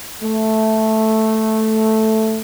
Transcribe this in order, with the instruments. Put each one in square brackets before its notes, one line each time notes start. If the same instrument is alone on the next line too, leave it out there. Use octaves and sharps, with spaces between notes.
[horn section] A3